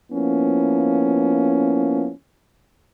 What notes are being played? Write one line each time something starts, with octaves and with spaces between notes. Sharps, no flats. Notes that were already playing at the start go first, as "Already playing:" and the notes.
F3 A#3 B3 C#4 E4